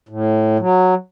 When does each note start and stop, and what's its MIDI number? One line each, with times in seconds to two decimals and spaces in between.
0.09 0.57 45
0.59 0.94 54